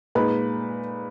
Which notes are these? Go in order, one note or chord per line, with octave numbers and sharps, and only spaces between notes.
A#2 G#3 D#4 B4 B5